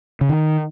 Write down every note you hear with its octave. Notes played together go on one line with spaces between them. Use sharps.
C#3
D#3